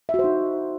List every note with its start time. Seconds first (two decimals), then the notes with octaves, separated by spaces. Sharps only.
0.09 E5
0.14 F#4
0.19 C5
0.24 D#4